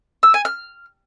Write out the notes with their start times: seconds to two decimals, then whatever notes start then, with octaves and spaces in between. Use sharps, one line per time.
0.23 E6
0.34 G#5
0.45 F6